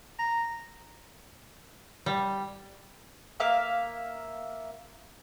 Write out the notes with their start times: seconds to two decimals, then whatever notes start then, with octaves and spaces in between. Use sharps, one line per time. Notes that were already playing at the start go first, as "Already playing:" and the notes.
0.19 A#5
2.06 G3
3.40 A#3 E5 F5